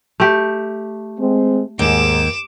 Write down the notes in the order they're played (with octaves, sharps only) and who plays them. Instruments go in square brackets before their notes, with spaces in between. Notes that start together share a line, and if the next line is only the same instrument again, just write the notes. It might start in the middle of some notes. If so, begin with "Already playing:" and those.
[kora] A3 G4
[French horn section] G#3 C4
[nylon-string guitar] D#2 [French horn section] G#2 [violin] D6 E7